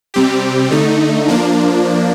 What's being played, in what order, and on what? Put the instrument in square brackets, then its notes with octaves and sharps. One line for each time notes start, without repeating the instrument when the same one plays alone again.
[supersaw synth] C3 G3 C4 G4
D3 A3 D#4
F3 A#3 D4